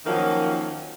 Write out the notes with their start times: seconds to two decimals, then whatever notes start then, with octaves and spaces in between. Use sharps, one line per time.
0.05 D#3 F3 F#3 A#3 C#4 D#4